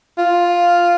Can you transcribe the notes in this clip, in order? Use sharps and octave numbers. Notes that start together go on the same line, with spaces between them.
F4